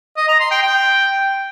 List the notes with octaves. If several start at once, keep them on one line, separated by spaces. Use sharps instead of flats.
D#5
A#5
C6
G5
G5